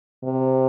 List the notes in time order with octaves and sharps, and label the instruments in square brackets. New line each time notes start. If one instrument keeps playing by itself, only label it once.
[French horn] C3